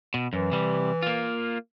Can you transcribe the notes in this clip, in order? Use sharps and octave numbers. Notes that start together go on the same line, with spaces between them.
B2
F#2 E3
C3 G3
A#3 F4